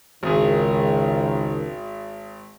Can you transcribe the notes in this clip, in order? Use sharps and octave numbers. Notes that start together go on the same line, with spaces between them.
G#1 C#2 D#3 G#4